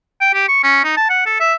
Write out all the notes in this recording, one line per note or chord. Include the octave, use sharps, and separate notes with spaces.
G5
G4
C#6
C#4
D#4
A5
F#5
A4
E5